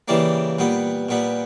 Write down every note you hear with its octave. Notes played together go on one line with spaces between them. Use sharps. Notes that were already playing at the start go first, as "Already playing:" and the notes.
C#3 E3 G3 A#3 D5
A#2 G3 B3
A#2 G3 B3